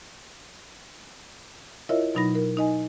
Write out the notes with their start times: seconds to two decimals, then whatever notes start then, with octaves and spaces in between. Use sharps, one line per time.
1.89 E4 F4 A#4 C#5 D#5 E5
2.15 B2 F#3 D#4 B5 A#6
2.35 A#4
2.57 D#4 D#5 G#5